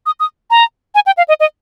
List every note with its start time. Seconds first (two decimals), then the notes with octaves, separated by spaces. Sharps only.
0.06 D#6
0.20 D#6
0.50 A#5
0.95 G#5
1.06 G5
1.17 F5
1.28 D#5
1.40 D#5